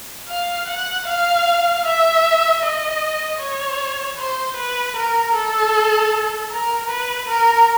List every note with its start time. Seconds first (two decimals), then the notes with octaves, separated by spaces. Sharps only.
0.29 F5
0.68 F#5
1.07 F5
1.84 E5
2.62 D#5
3.39 C#5
4.18 C5
4.56 B4
4.96 A#4
5.34 A4
6.52 A#4
6.90 B4
7.29 A#4